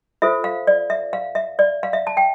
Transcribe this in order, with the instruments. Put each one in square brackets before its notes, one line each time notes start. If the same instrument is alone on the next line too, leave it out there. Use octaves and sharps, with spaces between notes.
[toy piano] F4 A4 C5 E5
F5
D5
E5
F5
E5
D5
F5
E5
A5
G5